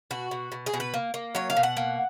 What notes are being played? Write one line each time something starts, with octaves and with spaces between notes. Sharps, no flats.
B2 F#4
B2
B2
G#4
B2
B4
A#3
A#3
F#3 C#5
F5
B2
F#5
A#3